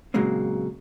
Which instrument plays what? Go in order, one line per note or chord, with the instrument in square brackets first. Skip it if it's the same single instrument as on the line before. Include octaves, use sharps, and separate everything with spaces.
[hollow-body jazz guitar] A#2 C#3 F#3 G#3 A#3 C4